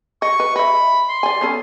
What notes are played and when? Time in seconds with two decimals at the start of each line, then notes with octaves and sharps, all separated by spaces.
0.22 D#5 C#6
0.40 B4
0.56 D#5 E5 B5
1.09 C6
1.23 D5 G#5
1.41 B3 C#4 A4